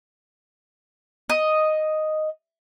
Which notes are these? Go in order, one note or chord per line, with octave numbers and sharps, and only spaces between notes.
D#5